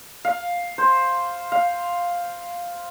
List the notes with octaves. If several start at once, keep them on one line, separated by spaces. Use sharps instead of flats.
F5
C5
F5